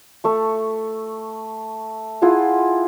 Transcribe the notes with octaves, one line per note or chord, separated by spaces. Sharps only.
A3 C#6
E4 F4 G#4 F#5